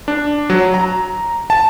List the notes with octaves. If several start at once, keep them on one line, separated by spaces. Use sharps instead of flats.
D4
F#3
A#5
A5